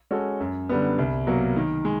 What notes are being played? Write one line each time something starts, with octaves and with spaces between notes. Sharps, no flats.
G#3 C#4 F#4 A4
F#2
D3 G3 B3
C2
B2 F#3 A#3
D#3
G#3